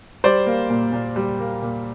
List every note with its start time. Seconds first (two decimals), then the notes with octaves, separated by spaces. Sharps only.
0.24 G3 C5 D5
0.47 A#3
0.70 A#2
0.93 A#2
1.16 G3
1.39 A#3
1.62 A#2